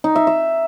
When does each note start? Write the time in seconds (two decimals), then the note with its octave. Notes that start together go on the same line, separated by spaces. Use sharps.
0.04 D#4
0.16 E5
0.27 E5